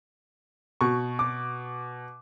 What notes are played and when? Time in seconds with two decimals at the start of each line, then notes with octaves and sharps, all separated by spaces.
0.81 B2 C#6
1.19 D6